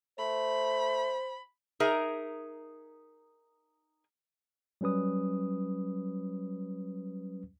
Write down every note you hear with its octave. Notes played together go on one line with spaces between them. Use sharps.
A3 C5 B5
D#4 G#4 A#4 E5
F#3 G3 C#4 B4 D#6